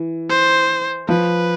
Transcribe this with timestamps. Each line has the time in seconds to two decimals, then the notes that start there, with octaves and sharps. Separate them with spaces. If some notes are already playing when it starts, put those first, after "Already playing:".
Already playing: E3
0.30 C5
1.09 F3 B4